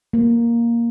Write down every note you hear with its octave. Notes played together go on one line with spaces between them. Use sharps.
A#3